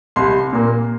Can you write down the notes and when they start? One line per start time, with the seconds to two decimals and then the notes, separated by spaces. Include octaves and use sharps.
0.16 C2 C6
0.53 A#2 A#3